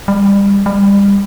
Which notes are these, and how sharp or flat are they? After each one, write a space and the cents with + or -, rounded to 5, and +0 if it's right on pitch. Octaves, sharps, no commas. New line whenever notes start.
G3 +25
G3 +30